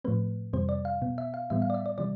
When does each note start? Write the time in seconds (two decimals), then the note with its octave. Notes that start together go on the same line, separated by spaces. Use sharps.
0.04 A2 F3 A3 C4 B4
0.53 F2 C3 E3 G3 C4 C5
0.69 D5
0.85 F5
1.02 B2 B3
1.18 E5
1.34 F5
1.50 A2 E3 G3 B3 E5
1.62 F5
1.70 D5
1.74 E5
1.86 D5
1.98 C3 E3 G3 D5